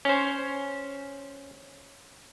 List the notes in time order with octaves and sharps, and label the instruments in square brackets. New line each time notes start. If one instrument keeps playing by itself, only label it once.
[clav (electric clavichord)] C#4 C5